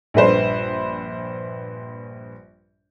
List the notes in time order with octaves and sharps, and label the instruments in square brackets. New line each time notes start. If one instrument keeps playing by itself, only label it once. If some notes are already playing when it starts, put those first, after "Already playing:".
[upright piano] A#1 G2 B4 C5